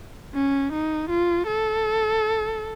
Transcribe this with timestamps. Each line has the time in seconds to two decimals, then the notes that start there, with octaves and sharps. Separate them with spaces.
0.35 C#4
0.73 D#4
1.10 F4
1.47 A4